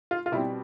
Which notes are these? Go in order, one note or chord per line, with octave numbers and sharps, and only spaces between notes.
F4
F4
B2 G3 C4 E4